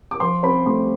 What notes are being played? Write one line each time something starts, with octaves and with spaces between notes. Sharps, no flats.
D6
F3 C6
C4 B5
A3 C6